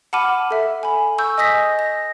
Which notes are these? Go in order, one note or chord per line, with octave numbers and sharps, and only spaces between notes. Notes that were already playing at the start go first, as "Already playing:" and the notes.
F#5 A5 B5 D6 F6 D#7
A4 E5
G#5 B5
C#6 E6 G6
D#5 G#5 D#6 A#6 B6
A#6